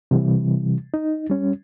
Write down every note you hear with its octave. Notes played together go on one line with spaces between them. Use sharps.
C3 E3 G3
D#4
G3 C#4